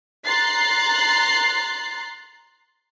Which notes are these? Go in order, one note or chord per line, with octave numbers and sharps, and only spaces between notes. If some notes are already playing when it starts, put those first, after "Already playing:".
A#5 C6 F#6 A6 C7